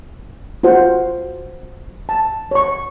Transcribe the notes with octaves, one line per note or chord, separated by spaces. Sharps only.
F4 F#4 C5 F#5
A5
C#5 C#6